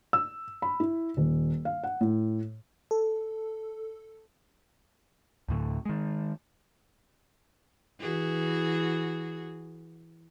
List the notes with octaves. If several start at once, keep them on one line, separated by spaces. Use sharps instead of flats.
E6
B5
E4
D#1
F5
F#5
A2
A4
D2 A2 D3
D#3 G#3
E3 F#4 G#4